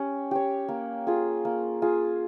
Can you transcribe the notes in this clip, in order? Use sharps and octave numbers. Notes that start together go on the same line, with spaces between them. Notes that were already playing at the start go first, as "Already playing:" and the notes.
Already playing: C#4 G4 C#5
G4 C#5
A#3
F4 G#4
A#3
F4 G#4